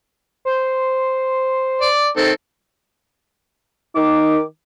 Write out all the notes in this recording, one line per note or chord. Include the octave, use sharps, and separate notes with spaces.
C5
D5 D6
D#3 C4 A4
D#3 D#4 D6